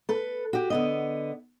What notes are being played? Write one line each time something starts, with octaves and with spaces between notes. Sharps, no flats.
A4 B4
F#4 G4
D3 B3 D#5